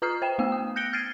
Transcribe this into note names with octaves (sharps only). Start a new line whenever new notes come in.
F4 B4 A#5 D#6 F6 C7
C5 G5 E7
A3 B3 G5 E6
D#6
F#6 G6 A#6 C#7 D7 G7
F6 G#6 A6 C7 D7 D#7